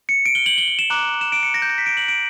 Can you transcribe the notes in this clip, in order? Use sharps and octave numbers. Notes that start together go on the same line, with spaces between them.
C#7
D7
G7
F#7
G7
F#7
E7
A#5 D6 F#6
E7
D7
C#7
A#6
G6
A#6
B6
D7
F#7
D7